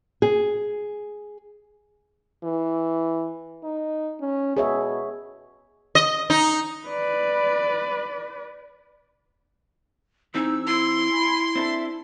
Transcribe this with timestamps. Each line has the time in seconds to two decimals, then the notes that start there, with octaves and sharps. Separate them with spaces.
0.22 G#4
2.44 E3
3.64 D#4
4.21 C#4
4.57 B2 G#4 C#5 E5
5.95 D#5
6.30 D#4
6.88 B4 D5
10.34 E3 C4 D#4 G#4 E6
10.67 E4 C6
11.10 G#5 B5
11.55 C4 D4 A4 E5